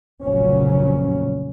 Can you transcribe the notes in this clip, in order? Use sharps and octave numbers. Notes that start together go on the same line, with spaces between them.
F1 A#1 A#2 C#3 F#3 C#4